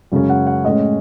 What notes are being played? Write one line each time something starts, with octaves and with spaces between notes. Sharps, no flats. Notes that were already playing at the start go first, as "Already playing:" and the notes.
F#2 C#3 G#3 C#4
F#5
F#5
A2 G#3 C#4 D#5